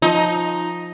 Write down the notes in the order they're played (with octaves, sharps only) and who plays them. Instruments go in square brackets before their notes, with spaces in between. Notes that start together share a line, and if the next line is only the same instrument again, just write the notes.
[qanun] F3 [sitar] D#4